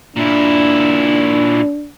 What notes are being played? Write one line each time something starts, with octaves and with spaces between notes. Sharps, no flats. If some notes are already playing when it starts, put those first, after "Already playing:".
A#2 D4 E4